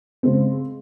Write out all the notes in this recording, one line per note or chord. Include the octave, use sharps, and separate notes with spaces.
C#3 G#3 C4